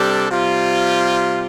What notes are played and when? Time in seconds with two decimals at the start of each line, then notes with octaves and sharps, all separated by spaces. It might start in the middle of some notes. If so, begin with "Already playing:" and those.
Already playing: C3 G3 D4 A4
0.31 C3 G3 F4